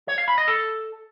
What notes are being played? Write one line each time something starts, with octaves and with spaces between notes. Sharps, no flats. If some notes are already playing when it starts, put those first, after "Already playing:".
C#5
F5
B5
D#5
A4